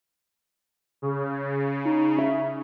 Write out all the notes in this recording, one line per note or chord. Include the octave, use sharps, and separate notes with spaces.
C#3
D#4
E5